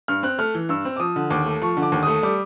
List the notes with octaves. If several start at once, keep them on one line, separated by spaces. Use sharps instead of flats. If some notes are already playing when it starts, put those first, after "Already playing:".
G2 F6
C4 F#6
A3 F6
E3
G2 E6
C4
D6
F3 D#6
D3
D#2 D6
A3
F3 C#6
D3
D6
D#2
A3 D#6
G3 D6